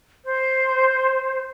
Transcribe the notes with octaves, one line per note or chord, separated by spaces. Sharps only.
C5